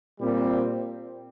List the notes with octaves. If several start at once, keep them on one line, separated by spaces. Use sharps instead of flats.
A#2 G3 C4